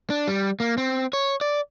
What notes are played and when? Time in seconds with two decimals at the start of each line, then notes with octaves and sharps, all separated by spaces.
0.10 D4
0.27 G3
0.60 A#3
0.78 C4
1.13 C#5
1.41 D5